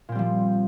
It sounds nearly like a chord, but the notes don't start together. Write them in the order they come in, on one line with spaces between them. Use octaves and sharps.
A#2 C4 G3 F3